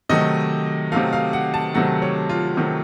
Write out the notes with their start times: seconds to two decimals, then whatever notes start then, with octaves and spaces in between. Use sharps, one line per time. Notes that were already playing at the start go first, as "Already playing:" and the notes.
0.09 C3 D#3 F#3 A3 D#5
0.92 C3 D#3 F#3 A3 F5
1.13 F5
1.33 F#5
1.54 A5
1.74 C3 D#3 F#3 A3 F#5
2.02 C#5
2.29 F4
2.57 C3 D#3 F#3 A3